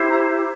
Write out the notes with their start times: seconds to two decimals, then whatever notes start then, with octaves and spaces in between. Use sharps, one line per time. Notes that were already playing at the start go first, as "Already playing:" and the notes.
Already playing: E4 G4 C5
0.09 A#5